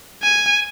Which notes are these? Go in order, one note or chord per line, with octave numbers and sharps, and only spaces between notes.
G#5